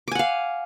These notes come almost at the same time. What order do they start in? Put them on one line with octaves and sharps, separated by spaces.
D6 G#5 F#5 F5